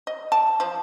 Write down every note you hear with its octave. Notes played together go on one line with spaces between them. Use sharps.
D#5
A5
F3